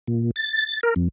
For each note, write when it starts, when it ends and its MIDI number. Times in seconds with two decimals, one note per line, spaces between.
0.07 0.31 46
0.36 0.81 93
0.83 0.94 70
0.96 1.08 41